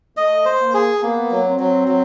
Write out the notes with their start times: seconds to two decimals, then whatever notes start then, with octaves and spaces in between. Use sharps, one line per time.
0.17 A3 D#5
0.45 C5
0.60 A#3
0.74 G#4
1.02 A#3 B3
1.31 F#3
1.46 C4
1.60 F#3
1.88 F#3